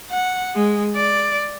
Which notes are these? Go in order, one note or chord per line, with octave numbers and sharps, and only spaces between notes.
F#5
G#3
D5